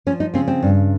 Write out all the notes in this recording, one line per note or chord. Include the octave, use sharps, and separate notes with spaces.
F3 C#4
D#4
C#3 C4
C4
G2